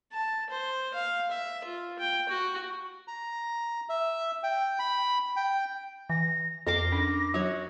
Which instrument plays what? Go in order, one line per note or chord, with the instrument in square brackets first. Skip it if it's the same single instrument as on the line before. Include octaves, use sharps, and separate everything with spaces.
[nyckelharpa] A5
C5
F5
E5
F4
G5
F#4
[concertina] A#5
E5
G5
B5
G5
[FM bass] E3 [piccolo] A#6
[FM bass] F2 [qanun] A#4 C6 D6 [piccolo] A#6
[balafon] C#4 D4
[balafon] F#3 [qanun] F#4 C#5